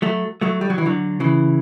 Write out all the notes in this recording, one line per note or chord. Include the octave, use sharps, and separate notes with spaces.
F#3 A3
F#3 A3
G3
F#3
E3
D3 F#3
C#3 E3